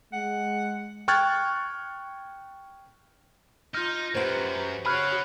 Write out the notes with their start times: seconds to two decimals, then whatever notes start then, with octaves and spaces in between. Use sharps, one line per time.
0.13 G#3 F#5
1.08 G5 C#6 F6 F#6 G#6 A6
3.75 D#4 F4 F6 G6
4.15 F#2 G4 B4 C5 F#5
4.86 C#4 F#4 G#4 C#5 B5 F6 F#6